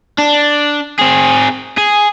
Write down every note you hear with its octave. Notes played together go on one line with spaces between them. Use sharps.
D4
C4 G#4
G#4